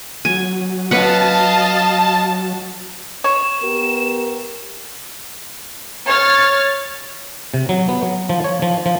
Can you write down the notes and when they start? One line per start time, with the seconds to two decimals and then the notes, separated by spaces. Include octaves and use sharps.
0.25 F#3 G#5
0.91 C#4 B4 D#5 F5 F#5 A5
3.24 C#5 E7
3.62 B3 G4 A#4
6.07 C#5 F6 A6
7.54 C3
7.69 F#3
7.89 B3
8.03 F#3
8.29 F3
8.44 C#5
8.62 F3
8.86 F3